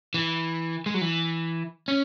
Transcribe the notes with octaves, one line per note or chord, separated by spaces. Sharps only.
E3
G#3
F#3
E3
C#4